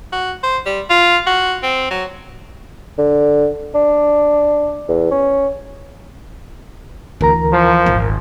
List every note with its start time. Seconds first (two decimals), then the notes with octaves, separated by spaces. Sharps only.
0.12 F#4
0.43 C5
0.66 G3
0.90 F4
1.27 F#4
1.63 C4
1.91 F#3
2.98 D3
3.75 D4
4.88 E2
5.11 C#4
7.21 D2 E3 A#4 A#5
7.53 F3
7.86 D#1 G#1